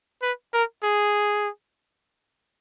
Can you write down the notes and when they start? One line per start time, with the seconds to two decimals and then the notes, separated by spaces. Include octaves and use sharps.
0.22 B4
0.54 A#4
0.84 G#4